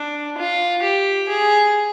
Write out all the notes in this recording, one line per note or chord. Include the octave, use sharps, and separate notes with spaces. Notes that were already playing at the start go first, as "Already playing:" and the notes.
Already playing: D4
F4
G4
G#4